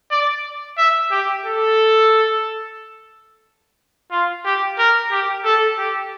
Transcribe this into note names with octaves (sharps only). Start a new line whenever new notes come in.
D5
E5
G4
A4
F4
G4
A#4
G4
A4
G4